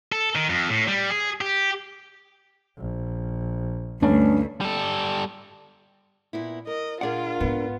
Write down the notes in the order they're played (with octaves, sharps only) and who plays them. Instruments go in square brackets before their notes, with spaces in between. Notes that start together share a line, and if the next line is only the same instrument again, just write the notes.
[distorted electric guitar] A4
D#3
F2
A2
G3
G#4
G4
[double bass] A#1
[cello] D2 [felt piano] G2 A3 C#4 [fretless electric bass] D4
[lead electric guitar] G3 A4
[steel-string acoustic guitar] A#2 B3 E4
[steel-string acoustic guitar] A#4 [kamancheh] D#5
[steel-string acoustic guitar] A#2 D4 A#4 [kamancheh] F4 [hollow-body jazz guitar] G#4 D5 F#5
[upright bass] G#2 D3 [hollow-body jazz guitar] B3